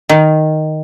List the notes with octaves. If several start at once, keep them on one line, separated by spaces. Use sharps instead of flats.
D#3